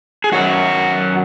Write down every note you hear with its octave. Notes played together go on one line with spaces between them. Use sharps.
G#4
F#2 D#3 F#3 F#4